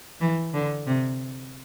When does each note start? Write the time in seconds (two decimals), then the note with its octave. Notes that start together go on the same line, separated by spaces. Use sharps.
0.20 E3
0.54 D3
0.87 C3